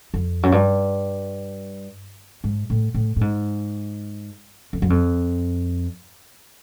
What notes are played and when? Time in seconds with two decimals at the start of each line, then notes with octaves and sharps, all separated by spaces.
0.14 F2
0.43 F#2
0.52 G2
2.44 G#2
2.70 A2
2.94 A2
3.16 A2
3.21 G#2
4.73 F2
4.82 F#2
4.90 F2